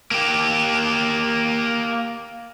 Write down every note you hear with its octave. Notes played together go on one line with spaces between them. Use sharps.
A#3 G4